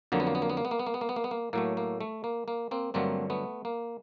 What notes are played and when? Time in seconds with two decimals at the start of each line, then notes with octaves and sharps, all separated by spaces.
0.12 F2 D3 F#3 A#3
0.20 B3
0.27 A#3
0.35 B3
0.42 A#3
0.50 B3
0.57 A#3
0.65 B3
0.71 A#3
0.79 B3
0.87 A#3
0.94 B3
1.01 A#3
1.09 B3
1.16 A#3
1.24 B3
1.31 A#3
1.53 A2 F#3 A3 A#3
1.77 A#3
2.01 A3
2.24 A#3
2.48 A#3
2.71 A#3 C4
2.94 G2 D3 F#3 A3 A#3 C4
3.30 A3 B3
3.65 A#3